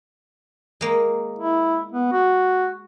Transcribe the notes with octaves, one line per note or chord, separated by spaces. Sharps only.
G#3 A#3
E4
B3
F#4